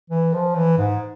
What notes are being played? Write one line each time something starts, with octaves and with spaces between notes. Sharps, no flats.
E3
F3
E3
G#2